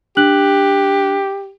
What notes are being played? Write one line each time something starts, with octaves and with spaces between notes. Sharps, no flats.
D4 G4 F#6 F#7